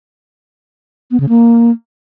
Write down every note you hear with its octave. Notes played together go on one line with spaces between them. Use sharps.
B3
C#3
A#3